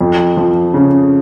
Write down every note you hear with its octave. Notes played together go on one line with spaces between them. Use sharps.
F2
F3
C#3